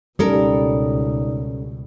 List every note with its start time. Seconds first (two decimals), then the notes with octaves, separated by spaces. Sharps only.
0.19 C#2 B2 G3 C#4 D#4 A4 A#4 D5